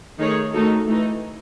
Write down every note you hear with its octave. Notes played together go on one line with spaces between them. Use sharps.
D#3 A3 D#4 G#4 C#5
D#3 A3 D#4 F#4 A4
E3 A3 D#4